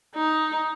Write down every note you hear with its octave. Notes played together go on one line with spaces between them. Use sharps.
D#4